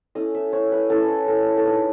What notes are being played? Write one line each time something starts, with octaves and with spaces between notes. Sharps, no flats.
A3 C#4 E4 D#5
E5
C#5
B4
A3 C#4 E4 A4
C#5
A4
A4
G#3 D#4 B4